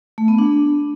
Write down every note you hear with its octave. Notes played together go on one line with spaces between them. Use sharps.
A3
B3
D4